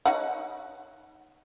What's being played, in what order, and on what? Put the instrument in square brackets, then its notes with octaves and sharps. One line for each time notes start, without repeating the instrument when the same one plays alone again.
[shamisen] D#4 C#5 F#5